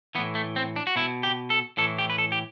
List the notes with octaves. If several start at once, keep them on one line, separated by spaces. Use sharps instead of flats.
A2 E3 B3
A3
C4
D4
F#4
B2 E4
G4
A4
A2 E3 A4
G4
B4
A4
G4